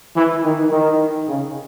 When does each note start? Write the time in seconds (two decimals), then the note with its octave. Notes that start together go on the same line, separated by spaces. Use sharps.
0.16 E3
0.44 D#3
0.71 D#3
1.28 C#3